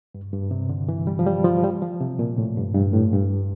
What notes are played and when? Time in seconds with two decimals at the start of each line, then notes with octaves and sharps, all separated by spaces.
0.15 G2
0.33 G2
0.51 C3
0.69 D3
0.89 E3
1.07 G3
1.19 F3
1.27 G3
1.44 F3
1.64 G3
1.82 F3
2.00 C3
2.19 A#2
2.38 A2
2.57 G2
2.75 G2
2.93 A2
3.13 G2